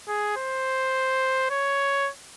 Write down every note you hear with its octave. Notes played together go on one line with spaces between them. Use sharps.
G#4
C5
C#5